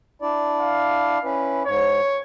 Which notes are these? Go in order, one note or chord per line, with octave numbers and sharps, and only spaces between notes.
D4 E4 D5
F5
C#4 E4 B4
G#2 C#5